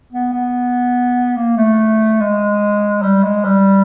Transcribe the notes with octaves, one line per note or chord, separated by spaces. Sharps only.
B3
B3
A#3
A3
G#3
G3
G#3
G3